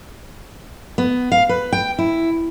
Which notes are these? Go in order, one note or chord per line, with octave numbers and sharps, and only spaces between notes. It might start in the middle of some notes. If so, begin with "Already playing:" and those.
B3
F5
B4
G5
E4